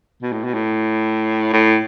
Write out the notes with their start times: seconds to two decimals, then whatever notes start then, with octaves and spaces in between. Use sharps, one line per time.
0.22 B2
0.32 A2
0.44 B2
0.54 A2
1.53 A2